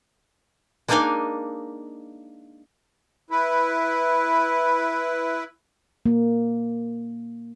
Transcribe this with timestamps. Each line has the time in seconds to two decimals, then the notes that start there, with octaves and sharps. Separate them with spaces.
0.88 G#3 A#3 D4 D#4 F5 G#5
3.31 E4 B4
6.06 A#3